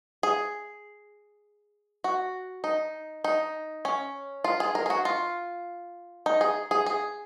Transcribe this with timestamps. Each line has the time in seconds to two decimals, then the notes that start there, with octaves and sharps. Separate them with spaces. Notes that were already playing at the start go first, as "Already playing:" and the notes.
0.23 G#4
2.04 F#4
2.64 D#4
3.24 D#4
3.85 C#4
4.44 F4
4.60 G#4
4.75 A#4
4.86 G#4
4.90 F#4
5.05 F4
6.26 D#4
6.41 G#4
6.71 G#4
6.86 G#4